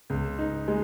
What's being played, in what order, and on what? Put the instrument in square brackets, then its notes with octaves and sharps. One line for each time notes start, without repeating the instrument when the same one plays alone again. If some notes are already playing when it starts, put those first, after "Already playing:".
[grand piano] C#2
D#4
G#3